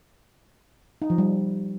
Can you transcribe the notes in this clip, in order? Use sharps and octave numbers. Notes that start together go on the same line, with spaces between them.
D#4
F3
G3